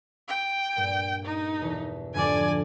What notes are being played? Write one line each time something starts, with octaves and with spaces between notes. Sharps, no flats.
G5
G2 A#2
D#4
E2 B2 E3
F2 G#2 D3 D5 G#5